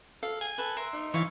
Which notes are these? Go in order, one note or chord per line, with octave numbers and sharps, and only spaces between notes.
A4 F5
G#5
A4 B4
A#4 E5 C6
D#4
E3 C#5 F5 C#6